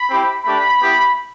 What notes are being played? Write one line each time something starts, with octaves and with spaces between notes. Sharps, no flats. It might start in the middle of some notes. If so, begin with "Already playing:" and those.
Already playing: B5
C4 E4 G4
A3 D4 G4 B5
B3 E4 G4